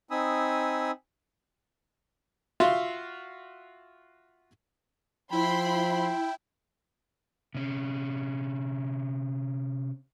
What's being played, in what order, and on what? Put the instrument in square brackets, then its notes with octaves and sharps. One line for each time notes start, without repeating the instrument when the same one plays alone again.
[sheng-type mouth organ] C4 D#4 G#5 B5 D#6 E6
[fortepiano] F4 F#4 E5 F5 C6
[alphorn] F3 [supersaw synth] E4 [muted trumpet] G5 [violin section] B5 C6
[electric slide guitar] C3 C#4